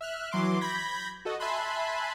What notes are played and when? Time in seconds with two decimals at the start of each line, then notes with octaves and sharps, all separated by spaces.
0.01 E5 F6 F#6
0.31 E3 F#3 C6 D6
0.61 B5 G6 G#6 A#6 B6
1.25 F#4 A4 D#5
1.40 E5 G#5 A5 B5 C6 F#6